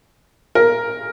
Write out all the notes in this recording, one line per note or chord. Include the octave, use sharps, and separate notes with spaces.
A#4